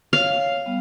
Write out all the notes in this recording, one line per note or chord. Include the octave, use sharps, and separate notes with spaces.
C#5 F5
G3 B3